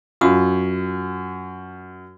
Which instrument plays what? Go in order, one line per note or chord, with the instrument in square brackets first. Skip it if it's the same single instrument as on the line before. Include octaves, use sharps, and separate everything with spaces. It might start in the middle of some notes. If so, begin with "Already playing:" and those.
[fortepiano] F#2 [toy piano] F4 F5 D#6